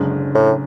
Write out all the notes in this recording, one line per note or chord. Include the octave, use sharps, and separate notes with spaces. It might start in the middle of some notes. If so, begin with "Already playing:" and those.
Already playing: F#1 F#2 D3 G#3 C#4
A2